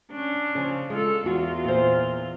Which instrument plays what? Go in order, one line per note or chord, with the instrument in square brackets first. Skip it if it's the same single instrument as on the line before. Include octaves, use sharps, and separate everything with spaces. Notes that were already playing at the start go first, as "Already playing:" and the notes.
[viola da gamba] C#4 D4
[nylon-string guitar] C#3 F3
[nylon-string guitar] G#3 [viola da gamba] F4 A4
[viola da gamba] E2 F4 [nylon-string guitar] F#4
[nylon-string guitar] A#2 C5